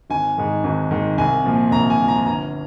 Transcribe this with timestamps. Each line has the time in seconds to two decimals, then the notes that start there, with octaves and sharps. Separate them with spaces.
0.10 G#1 G#5
0.38 G#2 D#3
0.64 G#1
0.91 G#2 D#3
1.18 C2 G#5
1.45 A#2 F3
1.71 C2 A#5
1.90 G#5
1.98 A#2
2.03 F3 A#5
2.26 G1 A#5